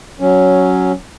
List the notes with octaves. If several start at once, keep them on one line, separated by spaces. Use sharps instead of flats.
F#3 C#4